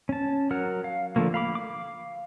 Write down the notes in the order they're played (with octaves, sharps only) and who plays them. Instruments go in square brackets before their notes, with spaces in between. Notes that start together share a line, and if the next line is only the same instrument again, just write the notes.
[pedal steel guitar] C#4 A5
F#3 A#4 F#5 F6
F5
D3 F3 A3 A#3
F5 B5 D6
F5 D6